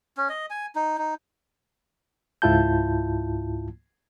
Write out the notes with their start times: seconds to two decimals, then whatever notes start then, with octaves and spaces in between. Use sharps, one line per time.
0.17 C#4
0.29 D#5
0.50 G#5
0.75 D#4
0.98 D#4
2.42 C#2 G#2 E4 F4 A5 G6